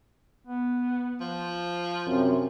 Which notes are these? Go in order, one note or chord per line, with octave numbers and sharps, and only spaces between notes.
B3
F3 C5
F#2 C3 C4